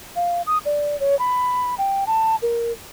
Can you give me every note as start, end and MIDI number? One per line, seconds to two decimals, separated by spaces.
0.16 0.42 77
0.47 0.58 87
0.65 0.98 74
1.00 1.18 73
1.19 1.75 83
1.78 2.04 79
2.07 2.36 81
2.42 2.72 70